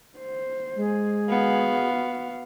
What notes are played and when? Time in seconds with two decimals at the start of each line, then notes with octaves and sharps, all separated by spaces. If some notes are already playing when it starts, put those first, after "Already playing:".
0.19 C5
0.78 G#3 G#4
1.29 B3 F#4 F5